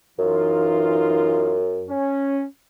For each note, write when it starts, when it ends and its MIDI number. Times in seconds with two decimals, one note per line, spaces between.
0.19 1.92 42
0.19 1.61 52
0.19 1.61 63
0.19 1.61 65
1.89 2.45 61